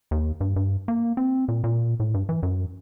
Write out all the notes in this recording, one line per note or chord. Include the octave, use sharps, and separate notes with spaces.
D#2
G2
G2
A#3
C4
A#2
A#2
A2
G2
E3
F#2